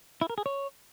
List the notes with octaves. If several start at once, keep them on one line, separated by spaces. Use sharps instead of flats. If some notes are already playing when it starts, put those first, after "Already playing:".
E4
A#4
G#4
C#5